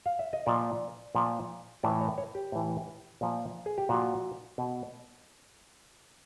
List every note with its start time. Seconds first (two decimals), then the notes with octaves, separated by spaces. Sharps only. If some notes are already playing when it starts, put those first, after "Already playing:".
0.06 F5
0.19 E5
0.33 D#5
0.46 A#2 F3 D5
1.15 A#2 F3
1.83 A2 E3 D5
2.01 C#5
2.18 C#5
2.35 G4
2.52 A2 E3
3.21 A#2 F3
3.66 G#4
3.78 G4
3.89 A#2 F3 F#4
4.58 B2